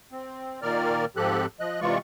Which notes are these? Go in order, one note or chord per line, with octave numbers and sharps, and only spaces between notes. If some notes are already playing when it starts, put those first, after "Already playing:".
C4
A#2 D#3 A#3 A#4 D5 F6
G#2 F3 C4 G4 A4 F#6
F3 D#5 F#6
C3 E3 G#3 F4 D5 C#6